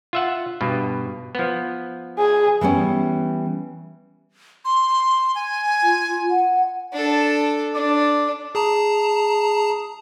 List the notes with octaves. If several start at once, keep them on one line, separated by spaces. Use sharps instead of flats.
F4 E5 F#5
G2 B2
F3 B3
G#4
E3 G3 B3 C#4
C6
G#5
F4
F#5
D4 A4
D4 D5
G#4 A5 A#5